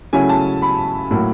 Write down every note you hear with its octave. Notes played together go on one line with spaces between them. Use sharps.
C#3 F#3 A3 C#4 E4 G#5
A5
B5
A2 F#3 A#3